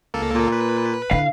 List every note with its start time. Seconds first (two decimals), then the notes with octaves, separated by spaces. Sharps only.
0.14 C#2 A#3 A4
0.35 A#2
0.52 B4
1.11 D3 E4 F5